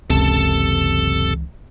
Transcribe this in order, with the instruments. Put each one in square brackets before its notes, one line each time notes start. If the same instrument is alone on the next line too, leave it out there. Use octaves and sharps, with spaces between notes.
[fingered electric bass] F#1 C3 [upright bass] C#2 E3 [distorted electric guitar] A4 A5